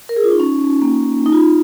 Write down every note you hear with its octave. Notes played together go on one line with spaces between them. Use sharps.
A#4
G#4
F4
D#4
C#4
A#3
D#4
F4
D#4